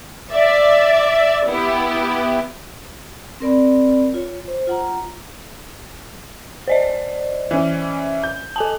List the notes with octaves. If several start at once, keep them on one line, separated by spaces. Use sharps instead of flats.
D5 E5
B3 E4 G4
C4 A#4 D5 B5
F4 C#5
C5
F4 F#5 A#5
C5 D5 D#5
E3 C#4
G6
A4 G#5 A5